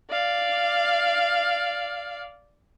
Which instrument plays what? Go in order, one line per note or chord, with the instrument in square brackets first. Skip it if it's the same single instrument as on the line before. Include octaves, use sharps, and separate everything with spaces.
[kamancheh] D5 F5